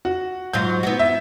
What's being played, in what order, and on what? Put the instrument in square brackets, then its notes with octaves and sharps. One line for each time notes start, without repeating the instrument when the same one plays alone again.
[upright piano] F#4
[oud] G#2 F#3 F4 [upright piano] G6
[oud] B3 E4 F#4
[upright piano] E5